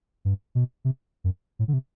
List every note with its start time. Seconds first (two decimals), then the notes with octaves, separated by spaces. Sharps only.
0.25 G2
0.55 B2
0.85 C3
1.24 F#2
1.59 A2
1.68 D3
1.73 C3